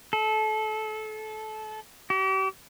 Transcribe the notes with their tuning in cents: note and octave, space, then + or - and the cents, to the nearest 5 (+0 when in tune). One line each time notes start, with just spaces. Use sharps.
A4 -25
G4 -40